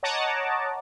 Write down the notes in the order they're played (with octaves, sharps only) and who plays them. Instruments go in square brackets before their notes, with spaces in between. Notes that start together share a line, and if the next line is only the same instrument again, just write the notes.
[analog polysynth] C#5 D#5 F#5 A5 A#5 D6